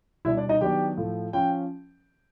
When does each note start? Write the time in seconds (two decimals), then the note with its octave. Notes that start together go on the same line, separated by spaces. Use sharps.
0.25 B2 G3 B3 D4 E4 E5
0.37 D4 D5
0.49 D#4 D#5
0.61 D#3 F#3 B3 D4 G4 G5
0.97 A2 F3 A3
1.33 F3 C#4 G5